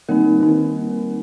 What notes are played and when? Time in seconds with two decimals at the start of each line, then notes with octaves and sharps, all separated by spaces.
0.09 D#3 G3 A#3 C4 D#4 A#4
0.39 D#3 G3 C4 D#4